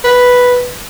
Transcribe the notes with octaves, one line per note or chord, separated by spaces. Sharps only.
B4